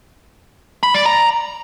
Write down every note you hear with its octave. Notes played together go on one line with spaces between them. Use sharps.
B5
D5
A#5